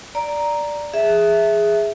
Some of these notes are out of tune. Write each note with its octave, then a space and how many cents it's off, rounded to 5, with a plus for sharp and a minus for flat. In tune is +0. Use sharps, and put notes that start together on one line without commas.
D5 +0 A#5 +0
G#4 +0 E5 +0